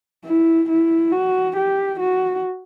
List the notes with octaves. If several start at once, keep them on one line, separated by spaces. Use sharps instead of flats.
E4
E4
F#4
G4
F#4